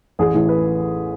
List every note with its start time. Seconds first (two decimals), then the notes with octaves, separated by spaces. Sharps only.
0.19 A1 G#4
0.34 A2 E3
0.49 B4